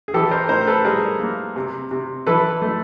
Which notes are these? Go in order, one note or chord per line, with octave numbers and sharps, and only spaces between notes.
G#4
E3 G4 A4
A#4 C5
A2 A#4 C5
A4 B4
G3 G#4 A#4
A#3
C3
C3
E3 A4 B4
A3